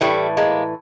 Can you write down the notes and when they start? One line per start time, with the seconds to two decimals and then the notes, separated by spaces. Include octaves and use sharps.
0.01 A2 E3 G3 A3
0.37 G#3 A#3